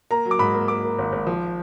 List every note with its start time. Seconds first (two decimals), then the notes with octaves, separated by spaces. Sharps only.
0.11 A#3 A#5
0.25 F#3
0.31 D6
0.39 G#2 B5
0.54 A#3
0.68 A#3 D6
0.84 A#3
0.98 G#1
1.12 G#1
1.27 F3